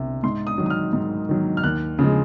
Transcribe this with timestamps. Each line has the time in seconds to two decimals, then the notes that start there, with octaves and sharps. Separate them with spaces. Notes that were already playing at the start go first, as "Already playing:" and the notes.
Already playing: C2 C3
0.23 G#2 C6
0.47 D#6
0.58 D#3 F#3
0.66 D#6
0.70 F6
0.93 G#2
1.29 D#3 F#3
1.57 F6
1.64 D#2 F#6
1.99 C#3 F3 G#3